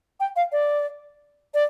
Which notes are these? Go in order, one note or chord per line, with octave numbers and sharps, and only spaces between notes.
G5
F5
D5
D5